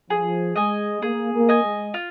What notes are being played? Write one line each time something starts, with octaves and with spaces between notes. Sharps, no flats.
F3 G#4
G#3 D#5 G#5
A#3 G#4
A#3
D#5 G#5
G#3
F4